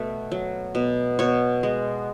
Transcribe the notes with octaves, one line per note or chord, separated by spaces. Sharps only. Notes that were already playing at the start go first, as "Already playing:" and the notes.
Already playing: B2 A3
F#3
B2
B2 C#5
G#3